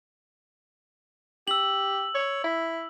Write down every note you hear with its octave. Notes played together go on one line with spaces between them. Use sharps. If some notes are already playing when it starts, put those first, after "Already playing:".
G4 E6 F#7
C#5
E4